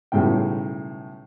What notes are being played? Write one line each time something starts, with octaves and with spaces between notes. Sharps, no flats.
B1 A2 C#3 G3 G5